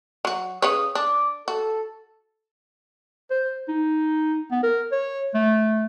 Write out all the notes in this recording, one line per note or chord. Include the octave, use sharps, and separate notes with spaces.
F#3 F#4
C#3 B4 C#5 D#6
D4 D6
F#4 A4
C5
D#4
B3
A#4
C#5
A3